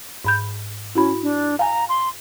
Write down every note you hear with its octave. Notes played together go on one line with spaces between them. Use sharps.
G#2 B5 G6
C#4 E4 F#4 B5
D4
F5 G#5 A#5
C6